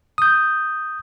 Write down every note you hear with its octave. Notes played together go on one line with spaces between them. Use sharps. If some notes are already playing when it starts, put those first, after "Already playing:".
D#6 G6